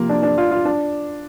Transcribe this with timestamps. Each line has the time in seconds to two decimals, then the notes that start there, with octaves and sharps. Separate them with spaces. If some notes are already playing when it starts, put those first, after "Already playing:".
Already playing: C3 F3 A#3 F4
0.09 D4
0.23 D4
0.38 F4
0.51 F4
0.65 D4